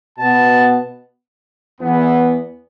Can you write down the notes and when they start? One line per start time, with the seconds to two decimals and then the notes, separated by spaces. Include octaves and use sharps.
0.18 B2 B3 A5
1.81 E2 E3 B3